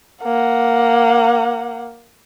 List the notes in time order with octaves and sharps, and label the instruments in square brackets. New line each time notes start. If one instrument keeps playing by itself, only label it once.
[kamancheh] A#3 F#5